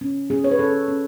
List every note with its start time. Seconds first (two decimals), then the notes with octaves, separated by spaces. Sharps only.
0.01 C#4
0.30 C#4 G#4
0.44 C#5
0.51 B4
0.59 C#4 A4
0.88 C#4